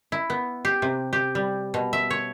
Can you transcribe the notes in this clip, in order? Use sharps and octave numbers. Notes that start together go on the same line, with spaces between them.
E4
B3
G4
C3
G4
G3
B2
E5
C#5